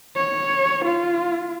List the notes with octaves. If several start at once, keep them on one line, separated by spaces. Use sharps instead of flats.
C#5
F4